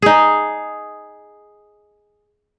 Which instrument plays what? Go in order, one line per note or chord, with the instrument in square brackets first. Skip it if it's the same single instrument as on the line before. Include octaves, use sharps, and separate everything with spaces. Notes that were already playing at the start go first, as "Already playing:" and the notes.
[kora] D#4 G#4